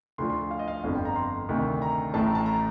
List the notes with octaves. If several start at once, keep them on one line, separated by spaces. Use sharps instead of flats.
D2 D3 F3 C6
C6
F5
D#5
F5
D#5
G1 F2 D3 F5
G5
A#5
C6
D2 C3 D#3
A#5
A1 A2 A3 A5
A#5
A5
A#5